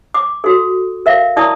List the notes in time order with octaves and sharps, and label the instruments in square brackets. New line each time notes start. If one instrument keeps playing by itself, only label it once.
[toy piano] D6
F#4 A4
A#4 E5 F5
E4 A#4 D5 A5 C#6 D#6